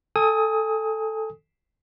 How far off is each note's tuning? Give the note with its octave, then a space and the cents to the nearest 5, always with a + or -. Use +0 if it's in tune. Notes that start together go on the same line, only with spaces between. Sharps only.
A4 +0 G#5 -25 D#6 +20